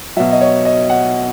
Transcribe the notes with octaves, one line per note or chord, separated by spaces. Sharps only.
B2 F#3 E5
D#5
C#5
D#5
F#5